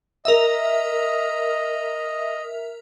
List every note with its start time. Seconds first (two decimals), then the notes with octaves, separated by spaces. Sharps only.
0.25 A#4 D#5 E5